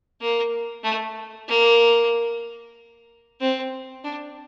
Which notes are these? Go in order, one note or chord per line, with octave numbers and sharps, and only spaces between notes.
A#3
A3
A#3
C4
D4